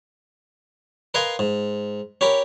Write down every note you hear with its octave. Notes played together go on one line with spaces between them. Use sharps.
A#4 B4 D#5 F5 G#5 C6
G#2
C#4 G4 A#4 B5